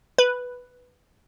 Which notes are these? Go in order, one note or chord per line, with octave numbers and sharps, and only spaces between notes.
B4